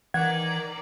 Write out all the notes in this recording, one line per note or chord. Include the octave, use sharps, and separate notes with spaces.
D#3 E3 D5 F#5 A#5 G#6